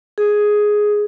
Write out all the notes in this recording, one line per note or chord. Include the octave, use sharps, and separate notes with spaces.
G#4